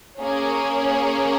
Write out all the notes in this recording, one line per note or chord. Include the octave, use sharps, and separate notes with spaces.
A#3 C#4 G#4 C#5